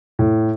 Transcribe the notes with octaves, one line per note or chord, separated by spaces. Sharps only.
A2